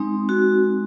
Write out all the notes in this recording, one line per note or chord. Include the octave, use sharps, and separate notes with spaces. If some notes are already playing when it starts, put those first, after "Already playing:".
Already playing: G#3 C4 D#4
F#4